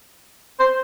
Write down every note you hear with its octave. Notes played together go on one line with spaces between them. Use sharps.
C5